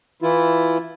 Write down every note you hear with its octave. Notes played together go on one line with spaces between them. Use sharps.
E3 E4 F4